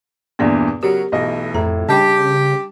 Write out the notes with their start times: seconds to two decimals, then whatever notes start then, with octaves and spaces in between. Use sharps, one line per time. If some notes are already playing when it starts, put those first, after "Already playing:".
0.39 E2 G2 A#2 B3 D5
0.83 C#3 F#3 G4 A#4
1.12 B1 E3 A3 D#5
1.55 F2 A2 A#5
1.89 C#3 G3 D4 G4 G5 A5